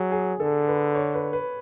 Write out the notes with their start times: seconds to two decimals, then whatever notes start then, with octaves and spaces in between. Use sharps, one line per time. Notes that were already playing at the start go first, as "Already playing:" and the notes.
Already playing: F#3 G#4
0.12 G#4
0.39 D3 A4
0.68 B4
0.95 C#5
1.14 B4
1.33 B4